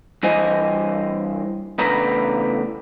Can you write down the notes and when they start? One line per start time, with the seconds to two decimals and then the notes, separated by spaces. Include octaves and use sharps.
0.23 G2 E3 C5 D#5 G#5
1.78 E2 A2 C#3 D4 B4 A#5